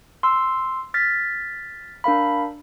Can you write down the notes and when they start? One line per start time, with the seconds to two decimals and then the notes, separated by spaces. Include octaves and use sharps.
0.23 C6 E6
0.94 F6 A6 B6
2.04 D4 A#4 F5 B5